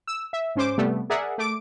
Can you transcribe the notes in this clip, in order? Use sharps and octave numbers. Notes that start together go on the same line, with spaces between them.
E6
E5
G#2 C#4 C5 D6
C3 G3 A3 B3
G#4 A#4 D5 E5 F#5
A3 D6 D7